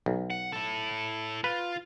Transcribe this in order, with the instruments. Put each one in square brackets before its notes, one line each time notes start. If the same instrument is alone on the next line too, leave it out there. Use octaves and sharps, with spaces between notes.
[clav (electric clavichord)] B1
[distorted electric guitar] F#5
E4 A4
[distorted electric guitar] F4 [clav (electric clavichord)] B4